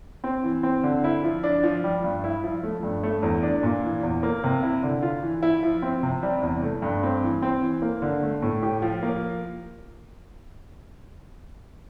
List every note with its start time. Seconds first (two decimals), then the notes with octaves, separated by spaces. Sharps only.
0.24 C4
0.44 E3
0.63 C4
0.83 D3
1.04 E4
1.23 F3
1.44 D4
1.64 F3
1.84 G3
2.04 G2
2.24 E4
2.44 F3
2.63 A3
2.83 G2
3.03 A3
3.23 E2
3.43 D4
3.63 A#2
3.83 E3
4.03 E2
4.23 A#3
4.44 C3
4.63 E4
4.83 D3
5.03 F4
5.23 E3
5.42 E4
5.63 F3
5.82 C4
6.03 C3
6.23 G3
6.42 E2
6.62 A3
6.82 G2
7.03 C4
7.23 E3
7.42 C4
7.62 E3
7.82 A#3
8.02 D3
8.23 A3
8.42 A2
8.63 G4
8.82 F3
9.03 A#3